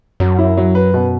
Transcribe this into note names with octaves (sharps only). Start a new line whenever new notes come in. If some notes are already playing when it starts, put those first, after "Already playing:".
F#2 F#3
E4
F#3
B4
B2